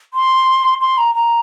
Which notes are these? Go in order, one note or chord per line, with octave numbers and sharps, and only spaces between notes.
C6
C6
A#5
A#5